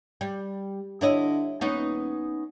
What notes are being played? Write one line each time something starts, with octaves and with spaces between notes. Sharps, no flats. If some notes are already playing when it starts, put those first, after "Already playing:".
G3
D3 E4 C#5 D#5
D#1 B3 C#4 D#4